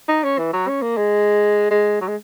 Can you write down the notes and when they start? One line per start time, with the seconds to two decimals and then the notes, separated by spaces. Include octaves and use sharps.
0.09 D#4
0.24 C#4
0.38 E3
0.53 F#3
0.68 C#4
0.82 A#3
0.97 G#3
1.71 G#3
2.01 F#3
2.08 G#3